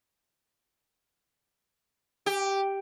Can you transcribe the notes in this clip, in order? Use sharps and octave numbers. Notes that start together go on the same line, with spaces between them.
G4